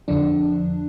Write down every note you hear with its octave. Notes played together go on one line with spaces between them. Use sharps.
F2 D3 F3 D4